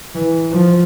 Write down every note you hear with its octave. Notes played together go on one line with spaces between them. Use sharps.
E3
F3